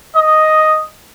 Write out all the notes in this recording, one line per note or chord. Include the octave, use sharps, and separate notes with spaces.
D#5